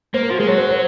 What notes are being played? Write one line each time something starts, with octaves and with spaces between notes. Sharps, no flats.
A#3 C5
A#4
F3 F#4
G#3 G#4
F#3 C#5
C5
C5